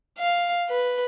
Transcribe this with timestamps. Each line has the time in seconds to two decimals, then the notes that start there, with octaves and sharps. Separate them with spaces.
0.19 F5
0.69 B4